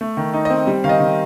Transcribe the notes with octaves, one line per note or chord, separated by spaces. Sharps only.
A3
D#3
D#4
D#5
C4
G3
D#3 F5
D#5
D#3